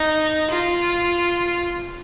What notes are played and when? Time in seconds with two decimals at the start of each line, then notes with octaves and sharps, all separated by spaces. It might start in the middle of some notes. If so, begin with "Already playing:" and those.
Already playing: D#4
0.51 F4